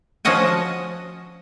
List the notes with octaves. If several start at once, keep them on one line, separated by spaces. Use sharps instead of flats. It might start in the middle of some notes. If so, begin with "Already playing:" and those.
F3 C#4 F#4 D#5 F#5 G#5